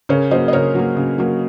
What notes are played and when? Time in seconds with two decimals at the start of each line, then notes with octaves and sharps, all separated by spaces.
0.09 C#3 A#4 C#5
0.31 F#3 A#3 C5 D#5
0.48 D#5
0.53 C#3 A#4 C#5
0.75 F#3 A#3
0.96 C#3
1.18 F#3 A#3